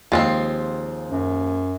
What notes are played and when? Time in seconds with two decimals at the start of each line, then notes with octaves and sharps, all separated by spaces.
0.12 D#2 F3 G#3 C4 A6
1.11 F#2